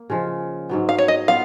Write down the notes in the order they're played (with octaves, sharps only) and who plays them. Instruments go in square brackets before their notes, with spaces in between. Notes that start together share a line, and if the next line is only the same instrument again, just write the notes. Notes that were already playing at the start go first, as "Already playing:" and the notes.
Already playing: [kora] A#3
C#3 F3 G#3
G#2 F#3 B3
[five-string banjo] F5
C#5
D#5
[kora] B3 F4 [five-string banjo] F5